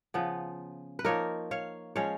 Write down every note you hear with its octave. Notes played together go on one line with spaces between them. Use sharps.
C#3 F3 B3
B4
F3 A#3 D#4 A#4 C#5
C#5 F5
F3 G#3 C#4 C#5 F5